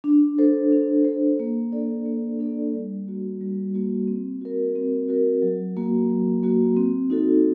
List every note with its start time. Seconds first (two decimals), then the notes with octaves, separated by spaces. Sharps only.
0.04 D4
0.38 A4 C5
0.72 D4
1.05 A4 C5
1.39 A#3
1.72 D4 A4 D5
2.06 A#3
2.39 D4 A4 D5
2.74 G3
3.07 A#3 F#4
3.41 G3
3.74 A#3 F#4
4.07 C4
4.41 F#4 A#4
4.75 C4
5.08 F#4 A#4
5.42 F#3
5.77 A#3 F#4
6.10 F#3
6.43 A#3 F#4
6.76 C4
7.10 D#4 F#4 A4